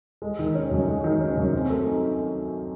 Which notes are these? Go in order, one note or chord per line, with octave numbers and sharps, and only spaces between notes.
G#3
D#3
C#4
F#2
G#3
D#3
C#4
F#2
C4
A3
D#4